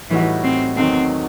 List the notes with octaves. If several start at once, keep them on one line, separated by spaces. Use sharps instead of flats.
A2 E3 G3 D#4 F#4
C4
E2 D#3 F#3 A3 C4 D#4